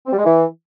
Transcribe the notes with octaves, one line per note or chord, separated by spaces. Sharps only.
C4
G3
G#3
E3